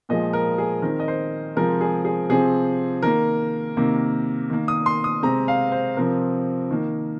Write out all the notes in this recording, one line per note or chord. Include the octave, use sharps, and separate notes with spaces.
A#2 F3 G#3 D#5
A#4
G#4
D#3 C4 A#4
D#5
C5
C3 F3 G#3 C4 A#4
G#4
G#4
C3 F3 C4 G#4
D#3 A#3 A#4
C3 D#3 A#3
D#3 A#3
D#6
C6
D#6
C3 G#3 C4 A#5
F5
C5
C3 F3 C4 A#4
D#3 A#3